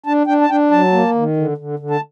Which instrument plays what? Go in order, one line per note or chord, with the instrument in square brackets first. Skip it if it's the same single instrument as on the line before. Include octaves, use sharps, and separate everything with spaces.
[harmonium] D4 A5
D4 G5
A5
D4 G5
F#3 A5
A#3
D#3
D3
D3
D3
A5